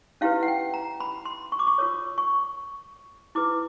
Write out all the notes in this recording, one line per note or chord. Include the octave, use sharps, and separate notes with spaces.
C#4 E4 G4 B4 F5
F#5
G5
A#5
B5
C6
C#6
D6
C#6
F4 A#4 C#5 D#6
C#6
E4 G#4 B4 D6